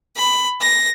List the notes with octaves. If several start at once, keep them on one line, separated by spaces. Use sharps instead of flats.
B5
A#6